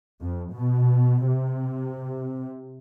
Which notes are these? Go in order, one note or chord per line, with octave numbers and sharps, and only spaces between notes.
F2
B2
C3